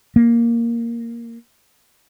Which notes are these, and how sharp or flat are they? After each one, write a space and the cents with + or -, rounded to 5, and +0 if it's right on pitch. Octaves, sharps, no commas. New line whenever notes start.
A#3 +0